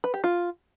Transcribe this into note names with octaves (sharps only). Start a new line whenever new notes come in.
B4
G4
F4